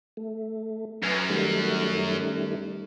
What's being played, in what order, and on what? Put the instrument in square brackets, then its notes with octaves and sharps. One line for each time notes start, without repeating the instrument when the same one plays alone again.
[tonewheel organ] A3
[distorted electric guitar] F#2 [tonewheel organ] B4 G#5 F6
[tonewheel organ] D#3 G3 A3